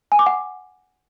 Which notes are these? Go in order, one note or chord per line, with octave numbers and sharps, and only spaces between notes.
G#5
D6
F#5